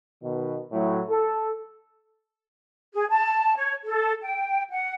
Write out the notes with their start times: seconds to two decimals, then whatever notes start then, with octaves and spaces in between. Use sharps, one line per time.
0.23 B2 D#3
0.72 A2 F#3
1.10 A4
2.93 G#4
3.10 A5
3.57 C#5
3.84 A4
4.22 G5
4.70 F#5